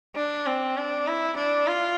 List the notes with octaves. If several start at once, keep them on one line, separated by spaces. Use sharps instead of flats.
D4
C4
D4
E4
D4
F4